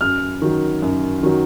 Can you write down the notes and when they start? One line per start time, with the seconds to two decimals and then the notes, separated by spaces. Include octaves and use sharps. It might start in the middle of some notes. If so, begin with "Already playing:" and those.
0.01 F#2 F6
0.42 D#3 F#3
0.82 F#2
1.23 D#3 F#3